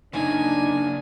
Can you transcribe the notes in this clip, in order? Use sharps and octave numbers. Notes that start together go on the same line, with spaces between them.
C#3 A#3 D4 D#4 G#5